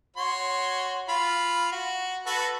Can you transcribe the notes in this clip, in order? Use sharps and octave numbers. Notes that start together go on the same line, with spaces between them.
F#4 C#5 C6
F4 B5
F#4
F#4 A4 B4